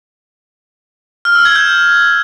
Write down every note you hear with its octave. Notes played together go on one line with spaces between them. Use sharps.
F6
E6
G#6
G6